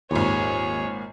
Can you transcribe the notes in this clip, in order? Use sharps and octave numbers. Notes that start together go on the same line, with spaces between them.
G#1 D#2 A#2 G#4 C#5